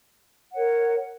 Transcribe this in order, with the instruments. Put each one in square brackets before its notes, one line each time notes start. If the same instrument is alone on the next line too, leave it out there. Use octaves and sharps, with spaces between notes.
[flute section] A#4 C#5 F#5